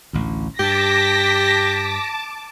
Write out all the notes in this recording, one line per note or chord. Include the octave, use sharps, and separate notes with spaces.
A1 D2
G2 G4 A5 D6 A#6 B6